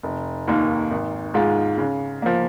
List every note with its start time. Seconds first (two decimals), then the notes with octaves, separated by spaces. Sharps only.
0.03 F1
0.47 D#2 D#3 A#3
0.91 G#1
1.34 G#2 G#3 F4
1.78 C#3
2.22 F3 A#3